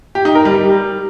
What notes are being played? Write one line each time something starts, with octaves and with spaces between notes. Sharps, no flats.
G4
D#4
A#4
G3
G3